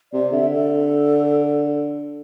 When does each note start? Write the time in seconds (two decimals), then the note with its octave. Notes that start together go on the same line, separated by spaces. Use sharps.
0.13 C3 D5
0.32 D3 E5
0.53 A4